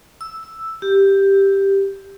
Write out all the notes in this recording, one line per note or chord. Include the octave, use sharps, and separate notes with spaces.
E6
G4